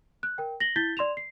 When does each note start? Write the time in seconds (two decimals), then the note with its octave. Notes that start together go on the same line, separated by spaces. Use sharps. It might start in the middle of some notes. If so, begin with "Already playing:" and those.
0.23 F#6
0.38 A#4 G5
0.60 A#6 F#7 G7
0.76 E4 G6 A6 B6 G7
0.97 D5 C6 E7 F7
1.17 C7